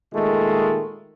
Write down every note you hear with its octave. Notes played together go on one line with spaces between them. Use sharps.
A#2 D#3 G#3 A3